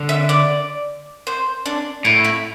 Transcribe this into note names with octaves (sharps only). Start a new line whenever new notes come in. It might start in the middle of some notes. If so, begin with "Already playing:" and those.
Already playing: D3
E5
D5
C5
D4
A2 E4
E4